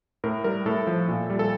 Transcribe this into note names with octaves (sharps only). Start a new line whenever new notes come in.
A2 A#4
G3 A#4
A2 A4
F3
A#2
G3
A4